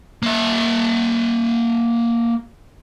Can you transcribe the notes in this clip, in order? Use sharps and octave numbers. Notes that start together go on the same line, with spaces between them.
A#3 E5